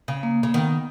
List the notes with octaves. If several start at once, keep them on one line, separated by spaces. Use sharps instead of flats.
C#3
A#3
C#3
D#3 B3